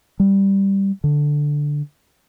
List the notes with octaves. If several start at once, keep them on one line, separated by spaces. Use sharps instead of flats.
G3
D3